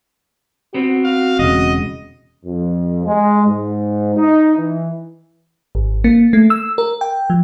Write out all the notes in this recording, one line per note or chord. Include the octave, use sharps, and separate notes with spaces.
B3 C4 F#4
F5
E1 C#3 D#5
F2
G#3
G#2
D#4
E3
G#1
A#3
A3
E6
A#4
G5
F3